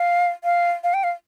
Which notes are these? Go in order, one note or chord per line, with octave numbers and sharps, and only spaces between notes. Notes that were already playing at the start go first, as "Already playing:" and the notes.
Already playing: F5
F5
F5
G5
F5